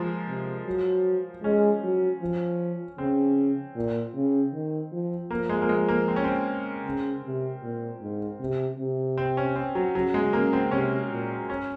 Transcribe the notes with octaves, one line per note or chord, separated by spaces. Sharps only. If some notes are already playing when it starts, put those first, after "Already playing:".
Already playing: F3 G#3 A#3
C3
F#3
G#3 C#4
F#3
F3
C#3 C4
A#2
C#3
D#3
F3
F3 A#3
G#3
A#3
G#3
A#3
C4
C#4
C4
C#3
C3
A#2
G#2
C3
C3
C4
C#4
C4
F#3
C#3 F#3
G#3
C#3 A#3
C4
C3 C#4
A#2
C#4